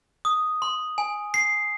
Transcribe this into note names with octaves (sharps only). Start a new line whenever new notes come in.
D#6
C6
G#5
C7